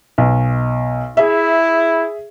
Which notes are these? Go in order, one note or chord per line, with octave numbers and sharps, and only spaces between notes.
B1
E4 G#4 E5